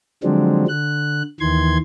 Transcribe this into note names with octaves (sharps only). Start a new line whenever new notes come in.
D3 F3 F#3 G#3 C4 D4
D3 F#6
D#2 D#3 E3 C6 G#6